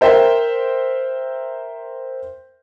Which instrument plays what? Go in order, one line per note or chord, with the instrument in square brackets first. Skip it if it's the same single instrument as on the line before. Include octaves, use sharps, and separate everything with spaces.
[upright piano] A#4 C5 E5 G5